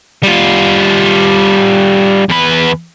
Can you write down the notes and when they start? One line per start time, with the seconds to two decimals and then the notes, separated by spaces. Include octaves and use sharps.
0.23 G3 F4
2.29 E2 B4